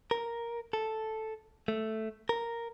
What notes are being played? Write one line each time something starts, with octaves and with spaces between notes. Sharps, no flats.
A#4
A4
A3
A#4